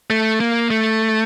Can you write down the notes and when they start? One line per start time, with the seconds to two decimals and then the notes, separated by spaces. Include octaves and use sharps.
0.10 A3
0.40 A#3
0.70 A3